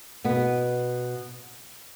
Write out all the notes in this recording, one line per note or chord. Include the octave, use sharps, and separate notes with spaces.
B2 B3